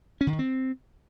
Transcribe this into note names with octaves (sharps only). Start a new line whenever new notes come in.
C#4
D3
D#3
C4